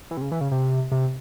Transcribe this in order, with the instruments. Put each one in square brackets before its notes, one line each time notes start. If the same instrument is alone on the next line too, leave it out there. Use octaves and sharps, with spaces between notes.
[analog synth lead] E3
C3
C#3
E3
C#3
C3
C3